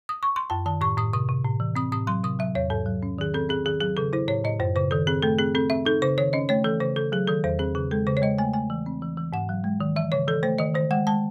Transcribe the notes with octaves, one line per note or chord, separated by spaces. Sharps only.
D#6
C#6
C6
F#2 A5
D#3 A5
A2 C#6
A2 D#6
C3 D#6
C3
A2
E3
C4 D#6
A2 D#6
F#3 C6
C3 D#6
F#3 E5
E2 C#5
G#2 A4
F#3
C#4
D#3 G#4
C4 A4
C4 G#4
D#3 G#4
F#3 G#4
C#3 A4
E4 C5
A2 C#5
A2 D#5
F#2 C5
C#3 C5
D#3 A4
C4 G#4
A3 A4
C4 G#4
C4 A4
C4 E5
D#4 A4
C#3 C5
D#3 C#5
C#4 D#5
A3 C#5
E3 A4
C#3 C5
C#3 A4
F#3 G#4
D#3 A4
E2 C5
C4 G#4
C#3 G#4
G#3 A4
C#3 C5
C#5
G#3 D#5
A3 G#5
A3 G#5
E3
C4
E3
E3
G#2 F#5
F#3
G#3
D#3
E3 E5
C#3 C#5
E3 A4
A3 C5
D#3 D#5
D#3 C5
G#3 F#5
G#3 A5